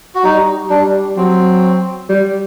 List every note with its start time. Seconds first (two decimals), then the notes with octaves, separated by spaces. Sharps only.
0.15 F#4
0.24 G3 D#4
0.70 G3 D4
1.17 F#3 C4
2.10 G3